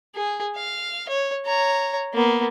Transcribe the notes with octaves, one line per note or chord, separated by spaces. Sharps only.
G#4
F5
C#5
C#5 A#5
A#3 B3